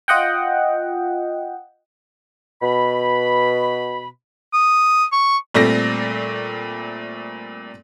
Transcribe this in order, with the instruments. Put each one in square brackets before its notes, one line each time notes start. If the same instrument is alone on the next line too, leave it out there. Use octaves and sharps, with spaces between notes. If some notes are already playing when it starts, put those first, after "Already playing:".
[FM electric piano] F4 D#5 F#5 G5
[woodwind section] B2 B5
[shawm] D#6
C#6
[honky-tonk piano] A#2 G3 A3 C4 A#6